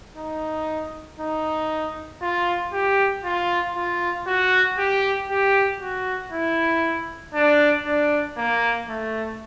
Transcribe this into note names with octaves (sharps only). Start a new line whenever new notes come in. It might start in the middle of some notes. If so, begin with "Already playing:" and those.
D#4
D#4
F4
G4
F4
F4
F#4
G4
G4
F#4
E4
D4
D4
A#3
A3